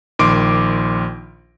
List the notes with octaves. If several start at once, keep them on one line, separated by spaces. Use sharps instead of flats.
A#1 D#3 C6 D6 D7